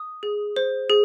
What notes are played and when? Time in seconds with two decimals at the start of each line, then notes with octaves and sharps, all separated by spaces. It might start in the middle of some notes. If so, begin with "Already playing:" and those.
Already playing: D#6
0.23 G#4
0.56 C5
0.90 G#4